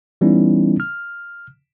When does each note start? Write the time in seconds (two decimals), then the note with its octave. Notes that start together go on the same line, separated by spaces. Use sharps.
0.21 E3 G3 B3 C#4 D#4 E4
0.80 F6